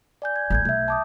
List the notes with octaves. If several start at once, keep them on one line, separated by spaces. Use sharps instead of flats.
D5 G#5 G6
G#6
A1 A3 G6 G#6
B1 E5 G6
A5 D6 D#6